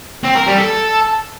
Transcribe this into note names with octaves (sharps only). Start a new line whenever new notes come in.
C4
A#4
G3
A4